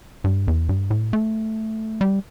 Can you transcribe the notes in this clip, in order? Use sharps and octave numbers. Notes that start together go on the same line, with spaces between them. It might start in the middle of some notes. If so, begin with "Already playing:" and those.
G2
E2
G2
A2
A3
G3